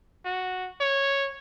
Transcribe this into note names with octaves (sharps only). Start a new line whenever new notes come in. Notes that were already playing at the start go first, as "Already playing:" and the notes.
F#4
C#5